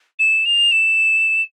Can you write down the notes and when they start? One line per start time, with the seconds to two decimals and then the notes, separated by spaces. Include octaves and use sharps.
0.19 E7
0.45 F7
0.72 E7